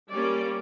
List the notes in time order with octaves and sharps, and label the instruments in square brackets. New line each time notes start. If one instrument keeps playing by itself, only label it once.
[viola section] G3 A#3 C#4 D5